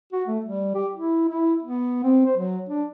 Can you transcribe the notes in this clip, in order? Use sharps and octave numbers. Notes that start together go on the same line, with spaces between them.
F#4
A3
G3
G4
E4
E4
B3
C4
C5
F#3
D4